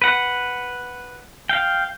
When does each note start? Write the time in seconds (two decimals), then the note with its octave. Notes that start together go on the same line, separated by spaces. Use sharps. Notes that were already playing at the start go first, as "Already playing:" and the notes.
0.02 B4 F#5
1.49 F5 G5